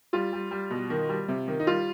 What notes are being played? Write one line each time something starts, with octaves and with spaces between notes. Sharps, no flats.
G3 F4
G3
G3
B2
D#3
G3
C3
D#3
D#4
G3 F4